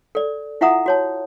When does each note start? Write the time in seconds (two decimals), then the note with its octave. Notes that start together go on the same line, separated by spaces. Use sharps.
0.15 A4 D5
0.61 E4 F4 E5 F#5 A#5 D#6
0.86 F#4 C#5 A5